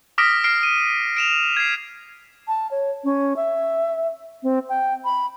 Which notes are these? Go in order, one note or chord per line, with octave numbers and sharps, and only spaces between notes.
D6 D#6 F6 A#6 B6 D7
F6 C7 D7
D#7
D7 E7 F7
G#6 C7
A5
C#5
C#4
E5
C4
G5
B5